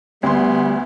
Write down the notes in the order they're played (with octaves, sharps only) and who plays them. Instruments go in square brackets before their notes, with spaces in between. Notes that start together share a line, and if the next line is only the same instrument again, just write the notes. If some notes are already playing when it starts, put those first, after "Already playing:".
[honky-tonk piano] D2 C6 [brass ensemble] G3 [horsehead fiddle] B3